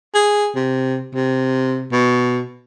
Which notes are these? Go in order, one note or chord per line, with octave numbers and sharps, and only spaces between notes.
G#4
C3
C3
B2